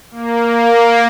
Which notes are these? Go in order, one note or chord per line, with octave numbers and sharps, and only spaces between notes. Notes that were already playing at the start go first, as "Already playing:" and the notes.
A#3